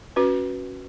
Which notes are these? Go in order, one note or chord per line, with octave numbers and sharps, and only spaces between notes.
C#4 F#4 B4